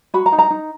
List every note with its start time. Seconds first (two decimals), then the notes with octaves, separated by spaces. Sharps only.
0.14 F#4 B5
0.26 A#5
0.32 D#4
0.39 A#5
0.51 D#4